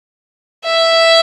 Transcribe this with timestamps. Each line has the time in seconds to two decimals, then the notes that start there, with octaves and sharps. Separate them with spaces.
0.65 E5